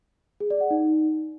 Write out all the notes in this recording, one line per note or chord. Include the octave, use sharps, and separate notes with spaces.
G#4
D5
F#5
D#4